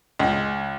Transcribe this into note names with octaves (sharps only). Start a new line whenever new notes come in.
C#2